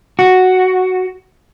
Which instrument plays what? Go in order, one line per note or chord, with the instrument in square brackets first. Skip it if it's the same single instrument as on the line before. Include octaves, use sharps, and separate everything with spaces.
[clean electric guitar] F#4